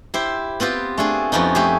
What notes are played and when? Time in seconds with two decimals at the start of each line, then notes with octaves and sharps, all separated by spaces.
0.14 E4 G4 C5
0.60 B3 C4 F4 G4
0.98 A3 D4 G#4
1.32 F2 F3 B3 C#4 D#4
1.55 A3 G4 G#4